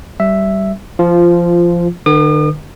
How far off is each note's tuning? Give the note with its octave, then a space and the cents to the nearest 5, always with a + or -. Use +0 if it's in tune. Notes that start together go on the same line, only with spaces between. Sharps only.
G3 -15 E5 +0
F3 -15 F4 +0
D3 +45 B4 +0 D#6 -45